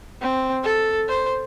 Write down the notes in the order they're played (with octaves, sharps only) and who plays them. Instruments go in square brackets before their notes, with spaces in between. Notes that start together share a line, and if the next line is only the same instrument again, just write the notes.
[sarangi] C4
A4
C5